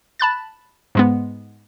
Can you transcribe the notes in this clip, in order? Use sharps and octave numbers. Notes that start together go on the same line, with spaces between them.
A5 B5 F#6 A6
G#2 G#3 B3